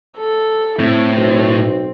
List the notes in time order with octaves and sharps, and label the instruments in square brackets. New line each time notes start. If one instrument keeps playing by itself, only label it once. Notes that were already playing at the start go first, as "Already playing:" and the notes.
[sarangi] A4
[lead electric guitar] A2 [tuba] C4 [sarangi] E4
[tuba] B1 [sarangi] C4